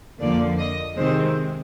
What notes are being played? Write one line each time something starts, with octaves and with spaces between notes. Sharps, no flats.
F2 D3 F3 A#3 D5
D#5
C3 D#3 G#3 C4 C5